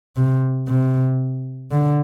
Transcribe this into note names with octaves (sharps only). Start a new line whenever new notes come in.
C3
C3
D3